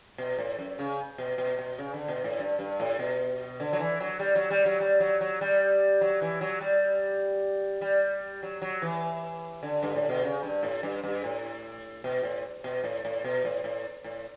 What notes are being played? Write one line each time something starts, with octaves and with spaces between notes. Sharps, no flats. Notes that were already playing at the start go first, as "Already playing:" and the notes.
B2
A2
F#2
C#3
B2
B2
B2
C#3
D3
B2
A2
G2
G2
A2
B2
D3
F#3
E3
F#3
G3
F#3
G3
F#3
G3
F#3
F#3
G3
F#3
E3
F#3
G3
G3
F#3
F#3
E3
D3
G2
A2
B2
C#3
G2
A2
G2
G2
A2
B2
A2
B2
A2
A2
B2
A2
A2
A2